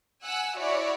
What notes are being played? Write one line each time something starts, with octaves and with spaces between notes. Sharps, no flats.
F#5 G#5 E6 F#6
E4 F#4 C#5 D5